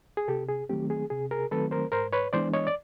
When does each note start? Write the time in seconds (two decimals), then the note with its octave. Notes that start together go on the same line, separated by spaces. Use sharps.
0.17 G#4
0.28 C3 G4 A4
0.48 G#4
0.69 D#3 F#3 A3 C4 G4
0.90 G#4
1.10 C3 G#4
1.31 G#4 A#4
1.51 D#3 F#3 A3 C4 A4 B4
1.71 A#4 C5
1.92 G#2 A#4 C5
2.13 B4 C#5
2.33 E3 G#3 B3 D4 C5 D5
2.54 C#5 D#5
2.67 D5